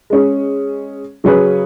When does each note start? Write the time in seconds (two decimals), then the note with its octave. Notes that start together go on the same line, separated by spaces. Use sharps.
0.10 G#3 C#4 G#4
1.24 C#3 F#3 C#4 G#4 B4